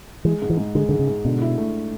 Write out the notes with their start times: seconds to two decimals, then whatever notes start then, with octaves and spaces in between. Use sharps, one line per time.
0.25 E3 G#3
0.42 G#2
0.50 E3
0.57 G#2
0.75 D3 G#3
0.89 G#2 D3
0.99 C#3
1.07 G#2
1.25 B2 D3
1.41 E4
1.58 A3